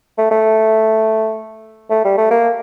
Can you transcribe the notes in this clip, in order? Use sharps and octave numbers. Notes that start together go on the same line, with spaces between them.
A3
A3
A3
G3
A3
A#3